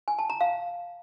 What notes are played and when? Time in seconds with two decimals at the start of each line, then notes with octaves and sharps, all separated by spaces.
0.08 G#5
0.19 A5
0.30 A#5
0.41 F5